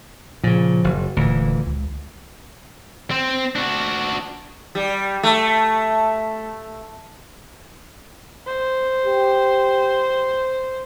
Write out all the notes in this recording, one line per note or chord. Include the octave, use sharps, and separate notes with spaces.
A#2 C#3 F3
F#1
D#1 D2 A#2 E3
C#2
C4
D4 F#4
G3
A3
C5
G4